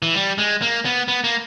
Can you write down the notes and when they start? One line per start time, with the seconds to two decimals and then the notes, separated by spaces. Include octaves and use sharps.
0.02 E3
0.15 G3
0.38 G#3
0.62 A#3
0.85 B3
1.08 B3
1.24 A#3